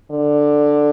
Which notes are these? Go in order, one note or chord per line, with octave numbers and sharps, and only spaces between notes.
D3